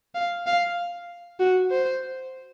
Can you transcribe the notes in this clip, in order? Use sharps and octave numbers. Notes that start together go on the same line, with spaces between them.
F5
F5
F#4
C5